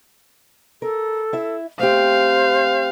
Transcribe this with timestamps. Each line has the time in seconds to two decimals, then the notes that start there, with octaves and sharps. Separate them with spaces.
0.82 A4 A#4
1.33 E4 E5
1.80 A3 C4 G4 C5 F5